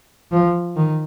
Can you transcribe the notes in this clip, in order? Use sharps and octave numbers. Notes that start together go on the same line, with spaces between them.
F3
D#3